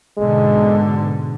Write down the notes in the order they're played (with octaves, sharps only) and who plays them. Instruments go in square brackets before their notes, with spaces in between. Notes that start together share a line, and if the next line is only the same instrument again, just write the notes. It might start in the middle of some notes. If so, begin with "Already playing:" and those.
[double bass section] G#2 B2 D3 [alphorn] G#3